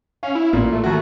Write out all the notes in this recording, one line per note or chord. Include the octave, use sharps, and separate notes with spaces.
C#4 F5
E4
A1 A#2
A3
D#2 F#4